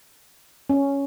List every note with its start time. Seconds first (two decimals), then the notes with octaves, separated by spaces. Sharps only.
0.70 C#4